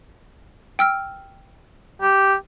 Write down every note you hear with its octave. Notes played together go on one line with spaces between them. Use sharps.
G5 E6 F6
G4